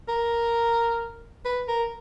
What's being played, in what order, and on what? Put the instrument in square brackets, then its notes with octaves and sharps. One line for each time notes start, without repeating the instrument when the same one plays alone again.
[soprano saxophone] A#4
B4
A#4